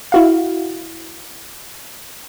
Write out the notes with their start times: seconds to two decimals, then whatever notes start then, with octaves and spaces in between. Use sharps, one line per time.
0.12 E4 F#4 F5